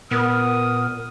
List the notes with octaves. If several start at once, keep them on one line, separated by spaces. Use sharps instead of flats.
A#2 B3 A#4 D#6